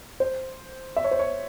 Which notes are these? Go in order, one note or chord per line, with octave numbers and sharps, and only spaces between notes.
C5
E5
C#5
C5
C#5